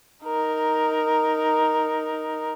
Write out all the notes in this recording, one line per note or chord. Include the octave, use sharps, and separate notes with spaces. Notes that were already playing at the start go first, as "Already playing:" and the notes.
D#4 A#4